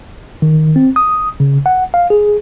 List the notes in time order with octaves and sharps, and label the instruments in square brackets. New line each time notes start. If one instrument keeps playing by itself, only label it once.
[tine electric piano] D#3
C4
D#6
C#3
F#5
F5
G#4